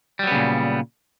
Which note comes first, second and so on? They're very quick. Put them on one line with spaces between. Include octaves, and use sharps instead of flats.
G3 F#3 B3 C#3 A#2